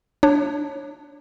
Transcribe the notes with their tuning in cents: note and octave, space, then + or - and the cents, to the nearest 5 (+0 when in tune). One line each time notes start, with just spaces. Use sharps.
D4 +0 C#5 -20